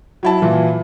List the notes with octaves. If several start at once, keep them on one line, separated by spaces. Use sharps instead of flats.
F#3 E4 A5
A#2 E3